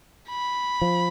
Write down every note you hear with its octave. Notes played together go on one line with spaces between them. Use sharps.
B5
F3